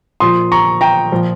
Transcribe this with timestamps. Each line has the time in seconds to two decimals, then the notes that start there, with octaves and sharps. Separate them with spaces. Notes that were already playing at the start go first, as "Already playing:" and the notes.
0.20 A#2 F3 C6 D#6
0.52 A#5 C#6
0.81 G5 A#5
1.12 A#2 F3